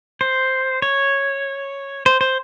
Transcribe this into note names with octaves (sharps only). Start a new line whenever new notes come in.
C5
C#5
C5
C5